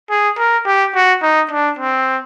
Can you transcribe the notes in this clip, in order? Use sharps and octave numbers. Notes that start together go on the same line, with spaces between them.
G#4
A#4
G4
F#4
D#4
D4
C4